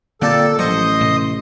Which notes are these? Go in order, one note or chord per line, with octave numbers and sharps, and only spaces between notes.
A#2 D3 A#3 C4 G4 A4 A5
A1 F3 F#3 C5 D#5 C#6 D#6
A2 C3